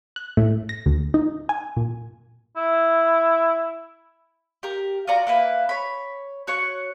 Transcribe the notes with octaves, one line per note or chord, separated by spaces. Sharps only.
F#6
A2
A#6
D2
D#4
G#5
A#2
E4
G4 A#4
F4 F#4 D5 A#5
A#3 E4 B4
C#5 B5
F#4 C#5 F#5 C#6